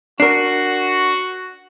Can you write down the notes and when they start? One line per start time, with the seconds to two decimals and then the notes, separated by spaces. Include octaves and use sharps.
0.20 D4 F#4 A#4 C7